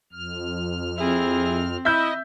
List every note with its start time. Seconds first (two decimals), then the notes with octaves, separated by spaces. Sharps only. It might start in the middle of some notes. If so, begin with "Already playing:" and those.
0.13 F2 F6
0.98 C4 E4 G#4
1.85 E4 D#5 E5 G6